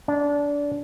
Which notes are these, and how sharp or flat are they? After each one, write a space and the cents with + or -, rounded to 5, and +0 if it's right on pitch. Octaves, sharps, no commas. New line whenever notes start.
D4 -20